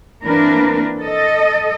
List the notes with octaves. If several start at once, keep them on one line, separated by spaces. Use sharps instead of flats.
E3 A#3 C4 D4 A#4 B4
A4 D#5